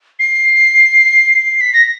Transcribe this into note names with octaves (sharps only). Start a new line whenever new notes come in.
C7
B6
A#6